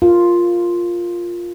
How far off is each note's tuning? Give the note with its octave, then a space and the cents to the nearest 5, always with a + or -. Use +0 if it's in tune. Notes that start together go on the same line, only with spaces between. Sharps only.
F4 +0 A#4 +0